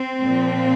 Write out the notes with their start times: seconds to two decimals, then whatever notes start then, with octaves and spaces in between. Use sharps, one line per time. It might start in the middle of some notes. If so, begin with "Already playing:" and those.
Already playing: C4
0.22 A#2 F3